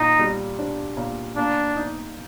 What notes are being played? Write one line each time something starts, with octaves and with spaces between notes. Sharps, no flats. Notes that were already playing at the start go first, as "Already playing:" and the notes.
Already playing: A#2 D#4
G3
D4
A#2
A#3 D4
D#4